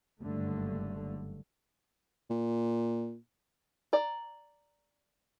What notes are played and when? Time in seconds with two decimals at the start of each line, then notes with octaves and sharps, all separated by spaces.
0.19 F#1 G2 D3 A3
2.30 A#2
3.93 D5 A#5